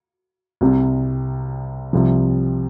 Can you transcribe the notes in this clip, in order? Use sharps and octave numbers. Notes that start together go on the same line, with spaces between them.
C2 C3 G3
C2 C3 F3